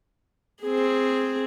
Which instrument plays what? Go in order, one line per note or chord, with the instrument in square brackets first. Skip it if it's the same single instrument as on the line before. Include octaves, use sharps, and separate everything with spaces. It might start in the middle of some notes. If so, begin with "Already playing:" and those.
[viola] C4 G#4